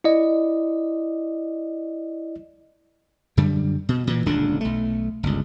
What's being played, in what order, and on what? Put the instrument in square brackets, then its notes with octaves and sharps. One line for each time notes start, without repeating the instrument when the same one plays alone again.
[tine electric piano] E4 D5 D#5
[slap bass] F#2 D3 G3
B2
A#2 E3
D#1 C#2 D3 D4
B1 A3
G1 C#2